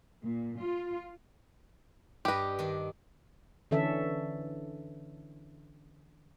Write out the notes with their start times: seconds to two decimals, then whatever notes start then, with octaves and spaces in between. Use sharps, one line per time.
0.25 A#2
0.60 F4
2.25 G2 G4 B4 D#5
2.59 D#3 D4
3.71 D3 E3 C#4 A4 E5